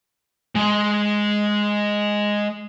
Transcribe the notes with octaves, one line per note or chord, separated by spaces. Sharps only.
G#3 C6